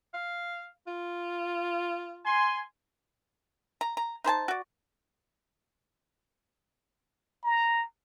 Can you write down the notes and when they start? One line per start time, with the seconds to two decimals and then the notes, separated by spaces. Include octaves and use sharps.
0.14 F5
0.87 F4
2.25 G#5 C6
3.81 A#5
3.97 A#5
4.24 D#4 C5 G#5 A5
4.48 F#4 D5
7.44 A#5